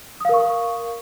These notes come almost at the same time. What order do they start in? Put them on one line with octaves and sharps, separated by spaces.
D#6 F5 A#4 C#6